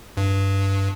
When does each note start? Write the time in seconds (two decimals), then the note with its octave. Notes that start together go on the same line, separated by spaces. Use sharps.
0.17 G2